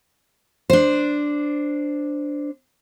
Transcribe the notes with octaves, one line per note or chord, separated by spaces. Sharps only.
D4 C5